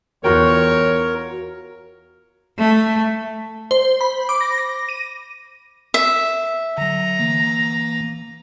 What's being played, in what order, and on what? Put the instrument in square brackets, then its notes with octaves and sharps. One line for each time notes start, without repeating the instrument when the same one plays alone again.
[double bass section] E2 [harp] F4 F#4 G5 [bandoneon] A#4 [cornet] C#5
[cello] A3
[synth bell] C5
B5
D6
A#6
A#6
D#7
[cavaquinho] E5
[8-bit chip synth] D3 F#3 [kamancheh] A#5
[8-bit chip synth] E3 A#3